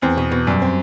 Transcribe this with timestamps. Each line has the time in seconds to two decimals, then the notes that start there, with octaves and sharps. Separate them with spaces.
0.02 E2 C4
0.17 B2
0.32 B2
0.47 F#2 G3
0.62 C4